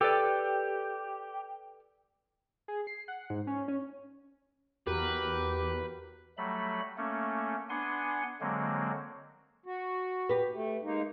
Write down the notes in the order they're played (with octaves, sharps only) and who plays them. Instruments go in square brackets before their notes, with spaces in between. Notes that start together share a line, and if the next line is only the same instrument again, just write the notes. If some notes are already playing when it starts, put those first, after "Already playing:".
[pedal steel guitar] G4 [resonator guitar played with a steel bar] A4 B4 D5
[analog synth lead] G#4
C7
F#5
G#2
C#4
C#4
[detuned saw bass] E2 [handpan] F#4 A#4 [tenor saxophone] G4 [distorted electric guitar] B4
[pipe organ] F#3 G3 A3 B5
A3 A#3 C#4
B3 D4 F#5 G#5 C6
D3 F#3 G#3 A#3 C4
[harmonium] F#4
[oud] G4 B4
[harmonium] A3
G#3 A#3 D#4